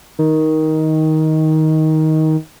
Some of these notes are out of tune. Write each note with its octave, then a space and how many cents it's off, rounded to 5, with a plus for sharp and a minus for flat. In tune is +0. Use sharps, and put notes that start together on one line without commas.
D#3 +15